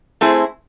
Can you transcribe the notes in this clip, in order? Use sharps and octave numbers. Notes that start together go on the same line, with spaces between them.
A3 C4 E4 G#4 C5